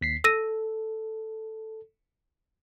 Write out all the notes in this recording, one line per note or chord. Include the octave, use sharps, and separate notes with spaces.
D#2 B6 C7
A4 E6 A#6 D#7